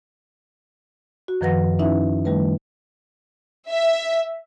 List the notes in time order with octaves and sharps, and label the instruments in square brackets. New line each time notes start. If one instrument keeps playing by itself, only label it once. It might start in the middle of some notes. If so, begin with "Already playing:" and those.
[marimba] F#4
F#2 D#3 F3 B4 F#5 A#6
C#4 D#4 E4 B4 E5
D#3 G3 A3 B4
[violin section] E5